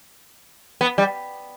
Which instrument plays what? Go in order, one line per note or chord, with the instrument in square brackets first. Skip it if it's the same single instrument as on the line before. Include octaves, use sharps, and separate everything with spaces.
[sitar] B3
G3